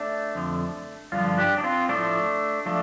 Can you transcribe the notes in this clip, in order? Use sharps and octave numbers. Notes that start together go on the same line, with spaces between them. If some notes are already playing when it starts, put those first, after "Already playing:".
Already playing: A3 D4
F2 D3 F3
G2 D3 F3 F4
D4 G4
D4
C4 F4
A2 F3 A3 D4
F3 A3 D4